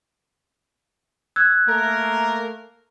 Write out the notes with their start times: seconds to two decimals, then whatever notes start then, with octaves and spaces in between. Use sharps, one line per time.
1.36 E6 F#6 G#6
1.68 A3 A#3 A#4